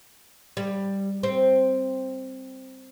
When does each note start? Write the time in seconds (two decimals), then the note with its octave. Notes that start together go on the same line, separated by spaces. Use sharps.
0.57 G3
1.23 C4